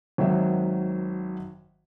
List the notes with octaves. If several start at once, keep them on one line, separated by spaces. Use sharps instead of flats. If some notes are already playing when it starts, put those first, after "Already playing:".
G#1 D#3 F#3 E5